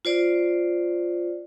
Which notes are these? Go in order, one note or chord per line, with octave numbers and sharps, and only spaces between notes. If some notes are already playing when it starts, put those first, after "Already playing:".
F4 C5 D5